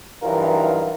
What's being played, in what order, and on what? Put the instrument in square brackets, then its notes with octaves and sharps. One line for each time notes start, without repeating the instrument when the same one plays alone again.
[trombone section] G2 E3 F#3 D#4 F4 A#4